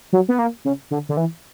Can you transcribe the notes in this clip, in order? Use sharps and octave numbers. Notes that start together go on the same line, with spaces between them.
F#3
B3
A#3
C#3
D3
D3
E3